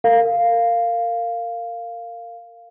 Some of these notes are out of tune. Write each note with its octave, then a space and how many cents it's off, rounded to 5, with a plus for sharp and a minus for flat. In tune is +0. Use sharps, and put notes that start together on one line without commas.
A#4 -25 F5 +0